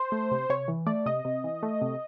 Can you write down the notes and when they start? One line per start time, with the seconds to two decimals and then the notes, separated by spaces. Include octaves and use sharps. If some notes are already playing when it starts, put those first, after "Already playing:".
Already playing: C5
0.12 A3
0.31 C3
0.50 C3 C#5
0.68 E3
0.87 A3 D5
1.06 C3 D#5
1.25 C3
1.44 E3
1.63 A3
1.82 C3